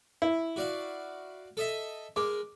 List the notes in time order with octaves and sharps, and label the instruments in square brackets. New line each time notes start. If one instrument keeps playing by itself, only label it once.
[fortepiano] E4
[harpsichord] F#4 D5 F5
A4 D#5 E5
[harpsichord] G#3 A#4 [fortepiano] D6